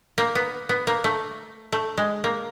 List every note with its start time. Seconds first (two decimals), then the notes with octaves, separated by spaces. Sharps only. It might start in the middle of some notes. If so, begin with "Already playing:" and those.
0.18 A#3
0.35 B3
0.69 B3
0.87 A#3
1.04 A3
1.72 A3
1.98 G#3
2.24 A#3